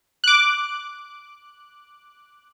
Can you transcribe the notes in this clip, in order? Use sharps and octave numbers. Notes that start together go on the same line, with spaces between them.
D6 F#6